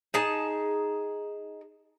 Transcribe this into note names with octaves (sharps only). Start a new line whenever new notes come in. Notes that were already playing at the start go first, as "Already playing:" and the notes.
D#4 G#4 A5